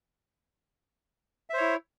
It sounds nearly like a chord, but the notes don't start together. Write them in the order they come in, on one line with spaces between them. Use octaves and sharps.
E5 C5 C#5 E4